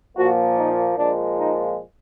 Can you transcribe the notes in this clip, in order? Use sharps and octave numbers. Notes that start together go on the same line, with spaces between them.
A#2 F3 A#3 F#4
D#4
A#2 F3 G#3 D4
D#4